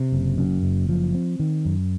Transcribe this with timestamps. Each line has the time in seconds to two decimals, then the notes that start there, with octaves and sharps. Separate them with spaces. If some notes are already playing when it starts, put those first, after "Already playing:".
Already playing: C3
0.12 F#1
0.38 F#2
0.63 F#1
0.89 F3
1.14 C4
1.39 D#3
1.65 F#2